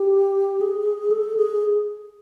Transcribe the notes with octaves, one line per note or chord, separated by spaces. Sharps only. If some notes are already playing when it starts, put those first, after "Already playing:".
Already playing: G4
G#4
A4
G#4